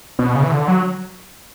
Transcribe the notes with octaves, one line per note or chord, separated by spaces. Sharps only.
B2
C#3
E3
D3
F#3